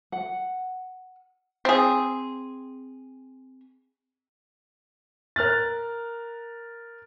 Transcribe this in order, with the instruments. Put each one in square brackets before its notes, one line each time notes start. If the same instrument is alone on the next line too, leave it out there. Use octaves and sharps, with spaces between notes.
[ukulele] F#5
[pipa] C4 G#4
[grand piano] A#4 F6 F#6 A6